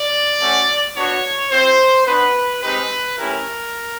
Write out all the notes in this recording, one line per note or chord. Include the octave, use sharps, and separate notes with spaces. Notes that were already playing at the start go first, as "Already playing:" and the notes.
Already playing: D5
A3 C#4 F#4
B3 D4 F#4 C#5
C4 F4 C5
B3 D4 F#4 B4
G#3 C4 D#4 G4 B4
A3 C#4 E4 G4 A#4